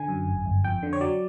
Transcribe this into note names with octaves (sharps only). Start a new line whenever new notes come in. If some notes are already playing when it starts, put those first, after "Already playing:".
Already playing: D3 G#5
F#2
G1
G1
F2 G5
D3
C#5
F#3 D5